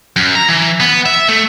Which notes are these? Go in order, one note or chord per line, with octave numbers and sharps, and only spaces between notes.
F#2
A#5
E3
B3
E5
A3